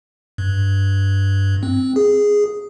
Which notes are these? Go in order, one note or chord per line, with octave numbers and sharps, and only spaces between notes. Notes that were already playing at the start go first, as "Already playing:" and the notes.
G2
C4
G#4